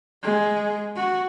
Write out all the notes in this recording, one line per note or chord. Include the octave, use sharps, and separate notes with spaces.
G#3
F#4